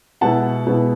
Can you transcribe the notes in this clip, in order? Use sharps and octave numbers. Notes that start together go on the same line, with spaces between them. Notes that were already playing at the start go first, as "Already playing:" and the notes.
B2 G#3 B3 E4 F#5 A5
B2 G#3 B3 E4